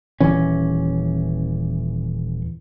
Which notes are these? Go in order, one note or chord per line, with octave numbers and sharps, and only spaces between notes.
D#1 E3 C#4